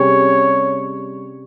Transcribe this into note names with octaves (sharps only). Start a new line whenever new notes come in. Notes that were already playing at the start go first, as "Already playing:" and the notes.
Already playing: C3 G3 C#4 G#4 C#5